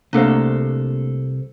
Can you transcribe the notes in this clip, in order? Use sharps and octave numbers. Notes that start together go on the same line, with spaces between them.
C2 A3 A#3 D4 A4 C5